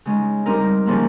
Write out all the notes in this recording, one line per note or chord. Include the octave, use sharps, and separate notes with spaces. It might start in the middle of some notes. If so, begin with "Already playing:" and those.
C#3 G#3 D#4
G3 C4 D#4 A#4
C#3 F3 A#3 F4